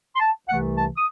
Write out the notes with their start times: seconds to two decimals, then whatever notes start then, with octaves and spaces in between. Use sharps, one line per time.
0.16 C6
0.20 A5
0.48 C2 C3 E3 A3 F#5
0.77 A5
0.96 D#6